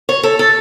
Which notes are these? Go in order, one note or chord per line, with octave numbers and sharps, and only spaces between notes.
C#5
A4
A4